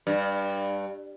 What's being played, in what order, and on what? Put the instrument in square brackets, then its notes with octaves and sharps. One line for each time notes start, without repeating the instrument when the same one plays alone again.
[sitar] G2